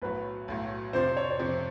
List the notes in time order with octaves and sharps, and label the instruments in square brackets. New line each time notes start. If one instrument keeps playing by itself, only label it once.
[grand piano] B1 A2 F#3 [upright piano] B4
[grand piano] B1 A2 F#3
[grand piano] F2 C3 F3 [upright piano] C5
[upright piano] C#5
C#5
[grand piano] F2 C3 F3 [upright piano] C5